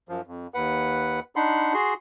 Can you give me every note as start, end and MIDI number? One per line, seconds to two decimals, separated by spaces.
0.09 0.21 42
0.09 0.21 53
0.27 0.47 41
0.54 1.20 39
0.54 1.20 71
0.54 1.20 78
1.36 1.73 62
1.36 1.73 63
1.36 1.73 78
1.36 1.73 83
1.36 1.73 84
1.74 1.94 66
1.74 1.94 68
1.74 1.94 84